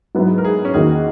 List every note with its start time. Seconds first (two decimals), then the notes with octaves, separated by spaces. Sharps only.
0.15 G#2 F#3 B3 E4
0.38 A#4
0.45 G#4
0.65 C#4
0.74 E2 D#3 A#3 D#4 F#4 G#4